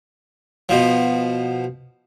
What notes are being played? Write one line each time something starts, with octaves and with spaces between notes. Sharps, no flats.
B2 F3